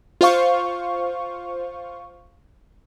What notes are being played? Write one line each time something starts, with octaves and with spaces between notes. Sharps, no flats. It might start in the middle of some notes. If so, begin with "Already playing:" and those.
F4 C5 F5 C#6